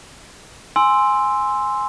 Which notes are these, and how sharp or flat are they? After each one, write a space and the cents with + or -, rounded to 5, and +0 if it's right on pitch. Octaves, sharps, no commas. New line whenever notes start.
G#5 +0 C6 +0 E6 +0